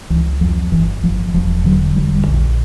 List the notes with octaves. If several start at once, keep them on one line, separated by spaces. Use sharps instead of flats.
C#2 E3
F2 F3
G1 E3
G1 F3
E1 F3
D3 F#3
E1 G3
A#1